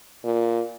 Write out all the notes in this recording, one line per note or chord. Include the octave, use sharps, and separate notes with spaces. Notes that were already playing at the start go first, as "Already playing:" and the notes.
A#2